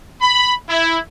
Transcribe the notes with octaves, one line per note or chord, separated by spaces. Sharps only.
B5
E4